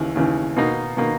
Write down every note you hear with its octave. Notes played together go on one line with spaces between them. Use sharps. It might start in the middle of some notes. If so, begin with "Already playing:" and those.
Already playing: D#2 C#3 E3
D#2 C#3 E3
B2 A#3 D#4
B2 A#3 D#4